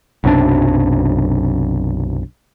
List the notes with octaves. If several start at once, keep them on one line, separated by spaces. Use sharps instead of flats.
B1 F#2 C3 D4